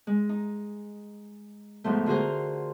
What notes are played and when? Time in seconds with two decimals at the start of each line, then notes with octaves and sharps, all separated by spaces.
0.07 G#3
0.29 D#4
1.84 G#2 B2 F3 A3
2.06 D3 F4 F#4 G#4 A#4 C5